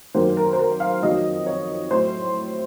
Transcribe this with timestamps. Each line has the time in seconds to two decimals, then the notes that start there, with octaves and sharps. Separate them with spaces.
0.14 F#2 D#3 F#3 A#3 C5
0.37 A#4
0.53 C5
0.59 A#4
0.80 F5
1.02 F2 D#3 F#3 A#3 D#5
1.47 C#5
1.90 A2 F#3 A3 C5